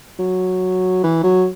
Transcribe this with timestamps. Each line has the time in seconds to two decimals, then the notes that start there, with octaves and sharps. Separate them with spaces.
0.19 F#3
1.03 E3
1.24 F#3